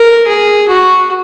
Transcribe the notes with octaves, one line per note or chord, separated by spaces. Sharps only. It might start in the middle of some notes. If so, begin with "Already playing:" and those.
Already playing: A#4
G#4
F#4